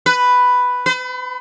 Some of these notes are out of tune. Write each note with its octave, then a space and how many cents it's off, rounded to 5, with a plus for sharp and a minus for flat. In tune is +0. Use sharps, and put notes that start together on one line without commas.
B4 +5
B4 +45